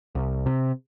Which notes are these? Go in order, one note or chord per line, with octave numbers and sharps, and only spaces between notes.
C2
C3